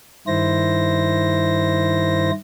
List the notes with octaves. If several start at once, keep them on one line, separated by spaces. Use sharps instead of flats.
G2 D#3 E4 C5 A#6